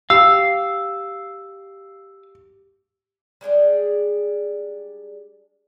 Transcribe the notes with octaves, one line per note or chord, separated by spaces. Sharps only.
G4 F5 E6
G3 G#3 D4 G#4